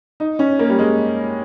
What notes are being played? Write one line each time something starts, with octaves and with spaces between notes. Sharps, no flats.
D#4
C#4
A#3
G3
G#3